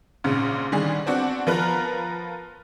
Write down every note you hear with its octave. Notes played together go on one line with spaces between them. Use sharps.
A#1 G#2 C#3
D3 D#3 G3 G#4
B3 C4 D4 F#4 F#5
F3 B3 A#4 B4 A#5 F#6